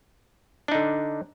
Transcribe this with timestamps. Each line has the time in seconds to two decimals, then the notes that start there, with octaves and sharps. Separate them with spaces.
0.68 D4
0.72 D#4
0.75 D3